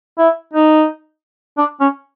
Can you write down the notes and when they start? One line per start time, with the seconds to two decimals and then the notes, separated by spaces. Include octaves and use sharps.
0.18 E4
0.53 D#4
1.57 D4
1.80 C#4